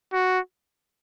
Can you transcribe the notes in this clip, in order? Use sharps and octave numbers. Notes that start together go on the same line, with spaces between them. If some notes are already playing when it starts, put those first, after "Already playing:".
F#4